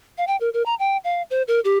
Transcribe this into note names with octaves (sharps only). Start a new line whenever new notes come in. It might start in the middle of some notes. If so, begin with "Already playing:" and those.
F5
G5
A#4
A#4
A#5
G5
F5
C5
A#4
G4